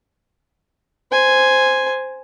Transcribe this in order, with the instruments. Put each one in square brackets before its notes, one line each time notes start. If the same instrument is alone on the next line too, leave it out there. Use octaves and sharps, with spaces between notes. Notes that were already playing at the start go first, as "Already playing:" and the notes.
[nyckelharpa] C5 G#5